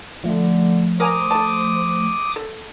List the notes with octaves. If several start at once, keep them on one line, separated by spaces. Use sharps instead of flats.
D3 F3 A3
A#4 C5 G#5 A#5 D6 D#6
A4 A5
A4